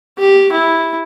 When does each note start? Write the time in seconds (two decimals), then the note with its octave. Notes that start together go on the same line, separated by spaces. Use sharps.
0.18 G4
0.52 E4